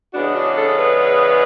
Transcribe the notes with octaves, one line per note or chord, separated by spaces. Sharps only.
E2 C#3 G#3 B3 D4 F#4
D4
A4
A4
B4